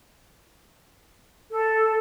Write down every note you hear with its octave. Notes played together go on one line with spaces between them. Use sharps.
A4